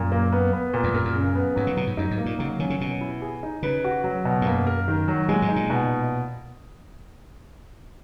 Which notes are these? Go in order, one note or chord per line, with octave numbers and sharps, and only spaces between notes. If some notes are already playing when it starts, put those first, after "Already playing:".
Already playing: F#2 A#2
A#3
B3
B3
A#2
E2
F#2 A#4
F#2
C#3
B3
G#2 F#3
C#3
B2 F#3
G#2
F#2 D#4
G#2
A#3
A#2
C#3 F#3
D#3 C#4
C#3
B2 C#4
E4
G#4
D#4
C#3 B4
F#4
F#3
B2
G#2
F#2 A#3
A#4
D#3
F#3
A#2 G#3
G#2
D#4
A#2
B2